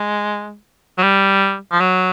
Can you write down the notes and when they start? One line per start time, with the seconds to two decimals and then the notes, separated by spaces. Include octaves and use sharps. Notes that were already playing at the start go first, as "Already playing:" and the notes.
Already playing: G#3
0.98 F#3
1.03 G3
1.72 F3
1.80 F#3